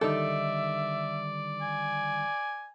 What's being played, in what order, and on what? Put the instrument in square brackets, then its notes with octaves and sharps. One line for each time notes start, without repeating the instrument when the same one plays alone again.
[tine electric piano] D3 D#3 G3 [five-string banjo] D#4 A4 [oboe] D5 [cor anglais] E5
[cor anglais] G#5